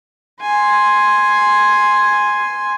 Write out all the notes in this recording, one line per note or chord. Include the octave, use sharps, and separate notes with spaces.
G#5 C6